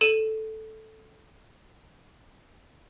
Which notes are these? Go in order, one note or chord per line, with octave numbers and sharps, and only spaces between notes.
A4 D#7 E7